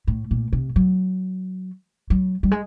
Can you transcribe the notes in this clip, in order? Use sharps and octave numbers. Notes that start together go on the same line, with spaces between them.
A2
A#2
C3
F#3
F#3
G3
G#3